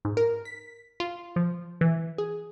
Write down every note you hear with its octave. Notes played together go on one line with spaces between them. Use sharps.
G#2
A#4
B6
F4
F3
E3
G#4